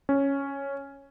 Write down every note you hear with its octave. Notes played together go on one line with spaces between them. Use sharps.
C#4